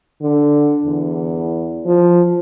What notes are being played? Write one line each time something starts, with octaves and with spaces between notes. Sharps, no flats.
D3
E2
F3